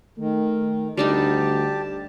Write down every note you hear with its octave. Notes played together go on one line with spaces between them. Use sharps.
D#3 A3
D2 G3 D4 D#4 G4 A5